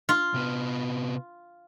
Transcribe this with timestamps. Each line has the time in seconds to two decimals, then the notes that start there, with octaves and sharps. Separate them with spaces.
0.09 F4
0.34 C3 B3 B4